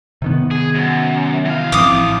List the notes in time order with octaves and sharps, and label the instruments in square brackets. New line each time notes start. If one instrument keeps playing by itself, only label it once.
[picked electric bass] C3 D#3 B3
[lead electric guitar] G#4
F#2
E3 F5
[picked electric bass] A1 F3 C4 [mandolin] D6 D#6